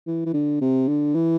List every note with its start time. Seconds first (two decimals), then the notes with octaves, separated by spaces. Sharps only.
0.07 E3
0.26 E3
0.34 D3
0.62 C3
0.88 D3
1.15 E3